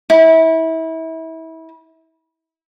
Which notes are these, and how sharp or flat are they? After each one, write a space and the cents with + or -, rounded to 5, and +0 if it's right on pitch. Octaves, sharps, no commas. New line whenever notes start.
E4 -30